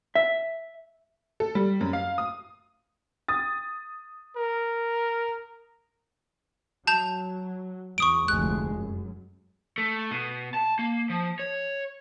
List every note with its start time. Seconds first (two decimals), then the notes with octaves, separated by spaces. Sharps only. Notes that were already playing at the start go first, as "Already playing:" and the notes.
0.15 E5
1.40 A4
1.55 G3
1.81 F#2
1.93 F5
2.18 D#6
3.28 D#6 A6
4.37 A#4
6.87 F#3 A5 G6 F7
7.98 E2 C#6 D#6 D7
8.28 F1 D2 G#3 F#6
8.75 F#2
9.78 A3
10.11 B2
10.54 A5
10.79 A#3
11.10 F3
11.40 C#5